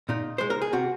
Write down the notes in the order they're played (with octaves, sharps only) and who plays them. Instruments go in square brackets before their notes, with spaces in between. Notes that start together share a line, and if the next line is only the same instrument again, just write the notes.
[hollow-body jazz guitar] A#2 D#4
G#3 C5
A#4
G#4
C3 F#4